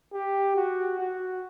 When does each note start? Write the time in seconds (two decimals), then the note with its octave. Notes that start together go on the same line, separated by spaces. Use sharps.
0.13 G4
0.56 F#4
0.99 F#4